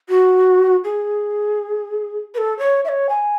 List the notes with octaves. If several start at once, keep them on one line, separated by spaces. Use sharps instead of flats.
F#4
G#4
B4
A4
C#5
E5
C#5
G#5